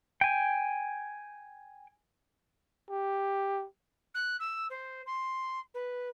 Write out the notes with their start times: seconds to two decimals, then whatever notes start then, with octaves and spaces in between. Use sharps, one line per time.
0.21 G5 G#5
2.90 G4
4.14 F#6
4.39 E6
4.69 C5
5.06 C6
5.74 B4